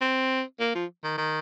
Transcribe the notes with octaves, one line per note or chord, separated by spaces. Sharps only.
C4
A#3
F3
D#3
D#3